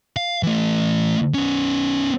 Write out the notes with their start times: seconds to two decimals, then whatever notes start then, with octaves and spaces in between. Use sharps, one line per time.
0.16 F5
0.43 E3 A3
1.34 B3 C#4